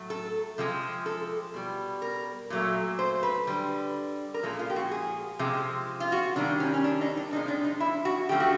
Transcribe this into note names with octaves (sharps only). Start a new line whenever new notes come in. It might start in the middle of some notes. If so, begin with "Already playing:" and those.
Already playing: A2 F#3 A3
A4
C3 F3 G#3
A4
B2 G3
A#4
A#2 F#3 A3
C5
B4
D3 G3
A#4
A#2 F3 G#3 A4
F4
G4
F#4
G#4
C3 F3 G#3
F4
F#4
C3 D#3 G3 D4
C#4
C#4
D4
D#4
D4
C3 F3 G#3 D#4
D4
D#4
E4
F#4
D3 F3 A3 G4
F#4